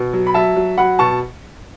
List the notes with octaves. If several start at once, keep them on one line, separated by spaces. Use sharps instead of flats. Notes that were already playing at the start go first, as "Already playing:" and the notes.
Already playing: B2
F#3
B5
F#3 E5 A5
F#3
F#3 F#5 B5
B2 A5 C#6